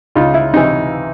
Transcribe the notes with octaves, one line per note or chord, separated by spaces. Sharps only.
C#2 D#4 F4
E4
C3 E3 D#4